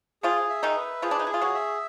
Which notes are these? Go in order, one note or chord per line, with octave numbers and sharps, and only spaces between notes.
F3 F4 G#4
E5
D#3 D#4
B4
F3 F4 G#4
D4
D#4
E4
F4 G#4
F#3 F#4
E5